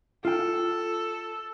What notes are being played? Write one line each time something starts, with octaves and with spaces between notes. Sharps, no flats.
F4 A4 G5